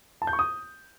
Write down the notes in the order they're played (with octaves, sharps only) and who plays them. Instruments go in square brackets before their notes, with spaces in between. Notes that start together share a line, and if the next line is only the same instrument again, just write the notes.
[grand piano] A5
G6
C#6
D#6